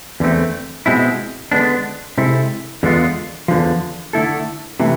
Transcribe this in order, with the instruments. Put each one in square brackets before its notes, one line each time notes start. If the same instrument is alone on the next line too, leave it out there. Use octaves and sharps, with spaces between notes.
[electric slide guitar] E2 D3 A3 C4
B2 G#3 C4 E4
D3 G#3 B3 D4
C3 G#3 C4 E4 A4
E2 D3 G#3 B3 F4
E2 D3 F3
D3 A3 E4 A4
C3 E3 A3